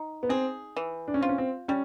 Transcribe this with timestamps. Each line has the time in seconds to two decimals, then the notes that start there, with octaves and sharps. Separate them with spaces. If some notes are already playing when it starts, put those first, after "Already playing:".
Already playing: D#4
0.23 B3
0.29 C4 G#4
0.76 E3
1.08 D4
1.14 C#4
1.21 C4 F4
1.29 C#4
1.38 C4
1.68 G3 C#4